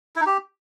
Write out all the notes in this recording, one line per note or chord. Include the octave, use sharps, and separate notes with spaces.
E4
D#4
G4